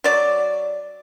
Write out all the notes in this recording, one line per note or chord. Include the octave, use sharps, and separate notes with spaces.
F#3 D5